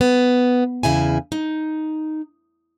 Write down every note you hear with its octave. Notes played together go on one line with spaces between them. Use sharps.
B3
E2 C#3 E4 G#5
D#4